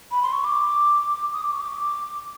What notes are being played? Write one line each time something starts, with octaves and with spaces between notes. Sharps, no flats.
B5
C6
C#6
D6
D#6
D6
C#6
D6